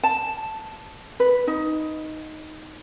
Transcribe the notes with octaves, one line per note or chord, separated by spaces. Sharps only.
A5
B4
D#4